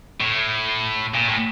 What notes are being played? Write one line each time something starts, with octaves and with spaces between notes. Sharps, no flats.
A2
A#2
A2